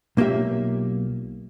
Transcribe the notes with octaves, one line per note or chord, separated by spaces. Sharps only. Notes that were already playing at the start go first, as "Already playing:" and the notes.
B1 A#3 F4 G4 E5